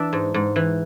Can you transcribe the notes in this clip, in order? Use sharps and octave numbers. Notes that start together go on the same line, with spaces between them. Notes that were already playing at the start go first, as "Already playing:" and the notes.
Already playing: E3 D4 D5 E5
G#2
G#2
E3